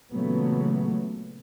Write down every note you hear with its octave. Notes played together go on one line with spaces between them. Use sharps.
A#2 C#3 E3 F#3 A3 B3